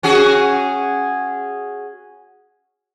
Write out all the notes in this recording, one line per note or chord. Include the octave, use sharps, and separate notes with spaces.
C#4 F#4 G#4